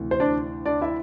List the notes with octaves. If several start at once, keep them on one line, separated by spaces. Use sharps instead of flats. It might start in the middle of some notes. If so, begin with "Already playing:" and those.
Already playing: D2 C3 E3
C5
D4 D5
D4 D5
E4 E5